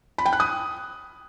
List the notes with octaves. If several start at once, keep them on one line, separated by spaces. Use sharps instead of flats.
B5
G5
F#6
D#6